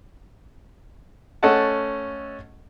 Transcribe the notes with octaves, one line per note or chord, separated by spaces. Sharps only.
A3 C#4 A4 D#5 F#5 A5